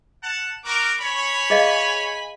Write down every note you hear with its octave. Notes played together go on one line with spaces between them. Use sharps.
F#5 A5
F#4 A#4 D6
C#5 G#5 B5
G#4 D#5 F5